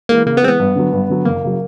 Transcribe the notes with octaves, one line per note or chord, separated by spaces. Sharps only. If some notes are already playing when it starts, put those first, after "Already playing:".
E3 G#3 A#3
C#3 A#3
B3
E3 G#3 C4
B3
G2
D3 F#3
G2
D3 F#3
F#1 A#3
C#3 F#3